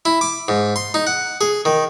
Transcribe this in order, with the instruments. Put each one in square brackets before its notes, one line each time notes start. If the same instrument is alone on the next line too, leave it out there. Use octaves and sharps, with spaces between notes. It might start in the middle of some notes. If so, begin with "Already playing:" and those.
[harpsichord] E4
D6
G#2
C6
D#4
F#5
G#4
D#3